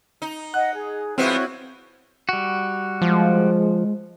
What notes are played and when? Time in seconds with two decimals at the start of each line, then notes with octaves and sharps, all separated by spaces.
0.22 D#4
0.54 D#5 F#5 F#6
0.73 G#4
1.18 F3 G#3 B3 C4 E4 F#4 C#5
2.29 G3 F#4
3.01 F3 G#3